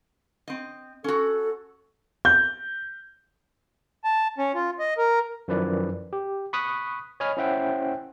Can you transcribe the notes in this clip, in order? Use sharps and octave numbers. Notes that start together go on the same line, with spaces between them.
C4 D#5
C#4 F#4 A4
G6
A5
C#4
F4
D#5
A#4
F#2 D#3 F3 E4 B4 D5
G4
B5 C#6 D#6 F#6 B6
C#5 D#5 G#5 B5 F6
C#4 E4 C5 E5 F#5 G5